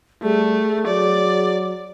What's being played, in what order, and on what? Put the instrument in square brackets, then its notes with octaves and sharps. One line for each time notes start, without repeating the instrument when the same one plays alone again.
[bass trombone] G3 [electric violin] A3 [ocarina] G#4
[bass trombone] F#3 [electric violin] D5